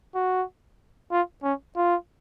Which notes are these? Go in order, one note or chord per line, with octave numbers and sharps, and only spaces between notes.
F#4
F4
C#4
F4